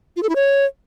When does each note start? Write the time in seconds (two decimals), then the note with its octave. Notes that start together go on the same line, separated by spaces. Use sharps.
0.16 F4
0.23 A4
0.29 E4
0.36 C#5